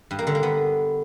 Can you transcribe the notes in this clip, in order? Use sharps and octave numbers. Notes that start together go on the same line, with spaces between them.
G2
A#3
D3
A#3
B3